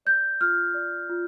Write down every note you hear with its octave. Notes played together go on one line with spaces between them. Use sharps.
D5 G6
F4 F6
D5
F4